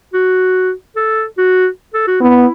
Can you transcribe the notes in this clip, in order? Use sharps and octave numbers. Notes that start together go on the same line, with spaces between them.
F#4
A4
F#4
A4
F#4
B3 E4